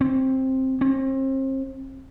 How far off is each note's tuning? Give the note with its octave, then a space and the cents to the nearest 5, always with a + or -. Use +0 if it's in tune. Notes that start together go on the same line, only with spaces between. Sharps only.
C4 +10
C4 +35